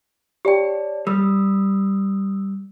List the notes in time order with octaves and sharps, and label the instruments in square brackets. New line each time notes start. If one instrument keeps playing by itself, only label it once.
[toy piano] G4 G5 [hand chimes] C#5 D5 A5
[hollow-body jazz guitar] G3 [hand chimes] D#6 E6